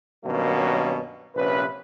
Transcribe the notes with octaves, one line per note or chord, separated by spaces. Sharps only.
G2 B2 D#3 F#3 A#3 C#4
A#1 C3 C#4 B4